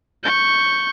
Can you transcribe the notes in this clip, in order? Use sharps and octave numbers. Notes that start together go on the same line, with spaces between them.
C#6 G6